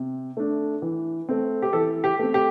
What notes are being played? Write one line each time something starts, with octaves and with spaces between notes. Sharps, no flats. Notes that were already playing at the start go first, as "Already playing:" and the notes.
Already playing: C3
A3 D4
E3
A3 C4
G4
E3 A4
G4
A3 C4
G4